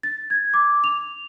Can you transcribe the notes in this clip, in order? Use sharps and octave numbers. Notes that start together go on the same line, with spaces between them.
A6
G#6
D6
F7